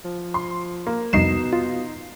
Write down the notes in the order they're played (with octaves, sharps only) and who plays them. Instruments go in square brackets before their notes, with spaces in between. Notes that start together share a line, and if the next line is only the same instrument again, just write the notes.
[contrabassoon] F3
[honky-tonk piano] C6
A#3
[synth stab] C2 F2 [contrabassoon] B2 [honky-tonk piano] D#4 C7 E7
[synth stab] F4